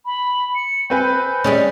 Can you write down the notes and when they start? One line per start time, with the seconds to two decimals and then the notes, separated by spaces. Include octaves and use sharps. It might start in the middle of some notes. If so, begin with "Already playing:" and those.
0.06 B5
0.55 C#7
0.90 C4 B4 G#5 G6
1.44 G3 G#3 C#4